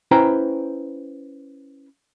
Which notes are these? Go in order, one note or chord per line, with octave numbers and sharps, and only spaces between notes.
C#4 E4 B4 C5 G5 A#5